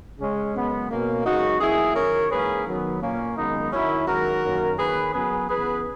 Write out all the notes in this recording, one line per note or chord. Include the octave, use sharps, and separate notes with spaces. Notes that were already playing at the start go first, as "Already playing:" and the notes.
C#3 G#3 C#4
F#2 C#3 G#3 B3
B2 A#3 C#4
F#2 C#3 G#3 D#4 F#4
F#2 E3 A#3 E4 G#4
D#3 F#3 C#4 A#4 C#5
G#2 E3 A#3 C#4 G#4 B4
D#3 F#3 B3
A#2 A#3 C#4
F#2 D#3 G#3 B3 D#4
F#2 D#3 F#3 C#4 E4
G#2 D#3 F#3 F#4 A#4
F#2 D#3 A#3 C#4
D#3 A#3 C#4 G#4 B4
F#2 C#3 F#3 B3 G#4 B4
C#3 E3 B3 G#4 B4